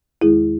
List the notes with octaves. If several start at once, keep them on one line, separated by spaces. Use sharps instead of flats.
E2 D#3 G#3 E4 G#4